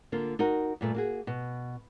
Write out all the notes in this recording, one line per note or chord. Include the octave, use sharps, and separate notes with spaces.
D3 A#3 F4
D#4 F#4 A#4
G2 A#2 A3
A#3 F#4 G#4
B2